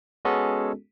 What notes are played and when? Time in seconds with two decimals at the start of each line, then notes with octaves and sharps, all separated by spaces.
0.25 G#3 B3 C#4 F#4 G#4 A4